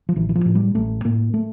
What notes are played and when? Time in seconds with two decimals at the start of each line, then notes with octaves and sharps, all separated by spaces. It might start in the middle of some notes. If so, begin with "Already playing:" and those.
0.09 F3
0.16 A1 E3
0.29 E3
0.35 F3
0.46 A2
0.55 G3
0.75 A1 A3
1.05 A2 A#3
1.34 A3